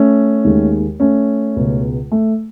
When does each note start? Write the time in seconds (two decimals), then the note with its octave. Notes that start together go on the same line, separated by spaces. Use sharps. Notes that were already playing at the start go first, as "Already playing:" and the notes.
Already playing: A3 C#4
0.45 D#2 D#3 G#3
1.00 A3 C#4
1.56 C#2 B2 G#3
2.12 A3